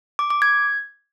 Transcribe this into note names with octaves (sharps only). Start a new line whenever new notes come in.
D6
D6
G#6